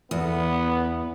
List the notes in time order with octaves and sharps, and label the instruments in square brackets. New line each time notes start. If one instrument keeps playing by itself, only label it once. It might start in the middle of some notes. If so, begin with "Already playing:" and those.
[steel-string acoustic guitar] E2 [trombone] B3